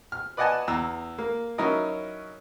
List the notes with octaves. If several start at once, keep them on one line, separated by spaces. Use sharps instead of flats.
F6
B4 D5 D#5 F#5 G#5 A5
E2 A#5 E6
A#3
F#3 C#4 D#4 E4 A#4 D#5